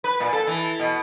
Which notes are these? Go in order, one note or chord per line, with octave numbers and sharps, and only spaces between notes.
B4
A#2
A4
E3
B2